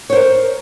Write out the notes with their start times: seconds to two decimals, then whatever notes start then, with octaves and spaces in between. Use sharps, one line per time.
0.10 C#5
0.13 C5
0.15 A#4